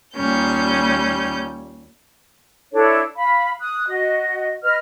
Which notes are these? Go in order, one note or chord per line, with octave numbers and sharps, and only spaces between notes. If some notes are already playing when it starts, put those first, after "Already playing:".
D#2 A#2 G3 C#4 G6
D4 E4 A4 C#5
F5 B5
D#6 F#6
F#4 D#5
B4 D#5 F6